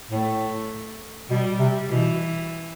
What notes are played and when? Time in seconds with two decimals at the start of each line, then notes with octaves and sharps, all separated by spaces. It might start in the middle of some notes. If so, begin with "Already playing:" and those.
0.11 A2 A3
1.30 B2 G3
1.59 C3
1.88 B2 E3